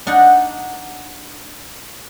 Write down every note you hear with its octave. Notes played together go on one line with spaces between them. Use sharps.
D4 D#4 F#5